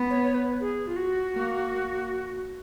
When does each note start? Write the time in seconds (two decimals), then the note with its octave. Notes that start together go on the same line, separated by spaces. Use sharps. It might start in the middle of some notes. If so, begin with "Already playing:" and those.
Already playing: B3
0.10 C#5
0.24 C#5
0.34 B4
0.60 G#4
0.87 F4
0.96 F#4
1.34 A#3